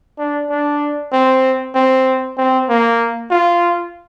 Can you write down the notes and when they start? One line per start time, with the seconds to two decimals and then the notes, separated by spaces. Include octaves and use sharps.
0.19 D4
0.50 D4
1.13 C4
1.74 C4
2.37 C4
2.69 A#3
3.31 F4